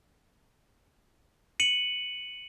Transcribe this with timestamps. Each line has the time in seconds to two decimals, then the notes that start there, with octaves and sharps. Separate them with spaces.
1.60 C#7 D#7 F#7